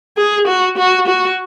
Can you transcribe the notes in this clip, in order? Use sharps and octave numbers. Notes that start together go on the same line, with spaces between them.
G#4
F#4
F#4
F#4